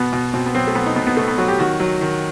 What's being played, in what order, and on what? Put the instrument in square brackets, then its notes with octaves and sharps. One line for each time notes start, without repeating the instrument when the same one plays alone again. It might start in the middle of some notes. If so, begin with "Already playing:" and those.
Already playing: [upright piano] B2 B3
B2
B2 C4
B3
F#3 C4
A3
F#3 B3
D#4
B2 B3
B3
B2 A3
B3
F#3 F#4
G4
D#3 F#4
F#3
D#3